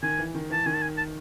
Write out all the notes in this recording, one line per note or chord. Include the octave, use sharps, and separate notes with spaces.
D#3 G#5
E3
D#3
E3 A5
D#3 G#5
A5
G#5
A5